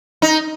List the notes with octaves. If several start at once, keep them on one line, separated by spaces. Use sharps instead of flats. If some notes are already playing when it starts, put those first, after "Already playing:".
D#4